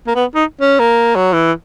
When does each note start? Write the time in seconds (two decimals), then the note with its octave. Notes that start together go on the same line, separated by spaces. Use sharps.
0.07 A#3
0.16 B3
0.35 D#4
0.61 C#4
0.79 A#3
1.15 F#3
1.33 E3